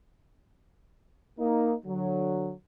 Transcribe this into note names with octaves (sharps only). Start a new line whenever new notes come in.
A#3 D#4
D3 F#3